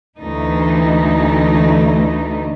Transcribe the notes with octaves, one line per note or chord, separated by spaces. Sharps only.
D2 E3 A3 D#4